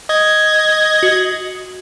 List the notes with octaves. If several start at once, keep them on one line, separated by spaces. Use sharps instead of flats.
D#5 G#6
F#4